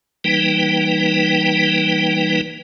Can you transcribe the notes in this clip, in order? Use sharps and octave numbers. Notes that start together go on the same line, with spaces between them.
E3 G3 A#3 D#4 B4 G5